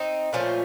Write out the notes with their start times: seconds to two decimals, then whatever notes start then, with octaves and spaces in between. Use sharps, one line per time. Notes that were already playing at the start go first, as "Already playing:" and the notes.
Already playing: C4 D#4
0.33 A#2 F3 A3 C#4 F4